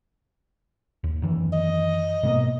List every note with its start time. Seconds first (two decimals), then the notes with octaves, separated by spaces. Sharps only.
1.04 D#2
1.22 F#2 D#3 E3
1.53 D#5
2.23 G#2 B2 A#3